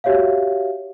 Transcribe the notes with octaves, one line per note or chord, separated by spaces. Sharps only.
F#4 G4 C#5 E5 F5